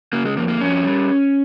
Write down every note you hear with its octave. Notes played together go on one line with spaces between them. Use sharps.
C#3 A#3
G#3
F2 A#3
A#3
F2 C#4
G3